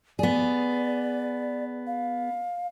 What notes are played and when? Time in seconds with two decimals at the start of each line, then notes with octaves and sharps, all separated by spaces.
0.19 B3 G#4 D5
1.87 F5